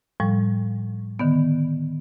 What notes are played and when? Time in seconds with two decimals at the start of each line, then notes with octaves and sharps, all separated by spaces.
0.20 A2 F3 G3
1.19 D3 D#3 B3